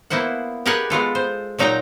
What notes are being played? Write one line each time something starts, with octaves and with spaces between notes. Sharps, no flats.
A#3 B3 E4 C5 F#5
G4 G#4 A#4 B4 F#5 G#5
G#3 B3 F4 A4
C5
A#2 F#3 D#4 F5 G5 A#5